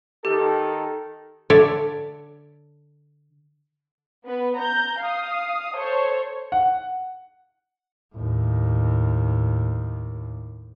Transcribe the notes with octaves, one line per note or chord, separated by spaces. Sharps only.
D#3 G4 A4
D3 C#5 D5 E5
B3 B4
A#5 G6
F5 D#6
A4 C5 C#5
F#5
D#2 A2